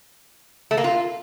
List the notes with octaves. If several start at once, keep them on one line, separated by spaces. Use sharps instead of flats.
A3
A#3
F4